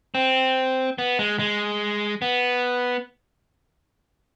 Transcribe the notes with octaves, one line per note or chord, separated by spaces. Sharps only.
C4
B3
G#3
G#3
B3